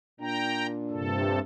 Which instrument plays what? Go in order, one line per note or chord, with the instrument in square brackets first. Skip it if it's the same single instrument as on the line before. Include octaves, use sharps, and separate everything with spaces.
[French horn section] A#2 D4 [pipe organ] G5 A#5
[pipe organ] G2 C3 A4